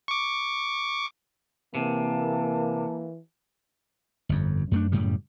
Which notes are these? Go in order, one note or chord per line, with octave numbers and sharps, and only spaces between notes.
C#6 D6
C3 E3 A#3 A5
G1 F2
F#2 A3 D4
F#2 A2 C#3 G3